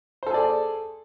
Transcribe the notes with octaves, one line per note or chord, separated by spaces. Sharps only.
G#4 A4 C5 D5